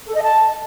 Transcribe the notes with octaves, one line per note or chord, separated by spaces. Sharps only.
A4
D#5
A5